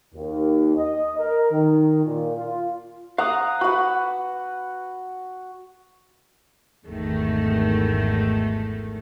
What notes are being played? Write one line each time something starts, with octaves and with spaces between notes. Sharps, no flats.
D#2
D#5
A#4
D#3
A#2
F4
F5 F#5 A#5 D6 D#6
F#4 B4 F#5 B5
G#1 E2 D#3 A3